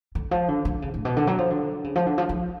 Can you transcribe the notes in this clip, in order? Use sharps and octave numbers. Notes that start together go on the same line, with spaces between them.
D3
F3
D3
D3
C#3
A2
B2
D3
F#3
F3
D3
C#3
F3
D3
F3
F3